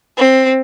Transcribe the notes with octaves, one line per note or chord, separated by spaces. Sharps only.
C4